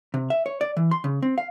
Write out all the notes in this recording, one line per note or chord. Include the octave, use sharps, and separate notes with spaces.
C3
E5
C#5
D5
E3
C6
C#3
C4
F5